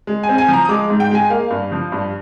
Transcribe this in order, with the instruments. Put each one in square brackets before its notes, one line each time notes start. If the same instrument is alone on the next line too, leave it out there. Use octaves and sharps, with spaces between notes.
[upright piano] G#3
G#5
C4
G#5
F3 A#5
D#6
G#3 D6
G#2
G5
G#3 G#5
A#3 F5
G2
F3
G2